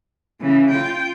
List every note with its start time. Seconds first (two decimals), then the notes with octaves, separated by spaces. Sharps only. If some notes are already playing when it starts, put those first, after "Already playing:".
0.41 C#3 E3
0.70 F4 G5